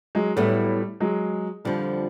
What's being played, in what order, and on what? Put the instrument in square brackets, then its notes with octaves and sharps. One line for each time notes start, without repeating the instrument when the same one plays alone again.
[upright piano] F#3 G#3
[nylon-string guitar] A2 F#3 B3 E4 [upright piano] G3 A3
[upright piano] F#3 G#3
[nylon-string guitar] F2 D3 F3 [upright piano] G3